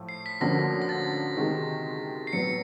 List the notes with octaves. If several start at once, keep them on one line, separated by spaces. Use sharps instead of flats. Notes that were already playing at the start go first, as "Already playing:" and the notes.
Already playing: A2 F3 A3
C7
B6
D2 D3 F3 A#3 C#4 A#6
A#6
A6
C3 D#3 G#3
C7
A2 F#3 B3 C#7